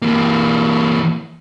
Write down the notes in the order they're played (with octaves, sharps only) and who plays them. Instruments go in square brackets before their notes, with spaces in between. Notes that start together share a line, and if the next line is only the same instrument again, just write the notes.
[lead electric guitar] E3 A#3